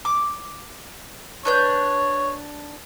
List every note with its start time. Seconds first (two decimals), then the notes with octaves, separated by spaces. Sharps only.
0.05 D6
1.45 D4 B4 C#5 G6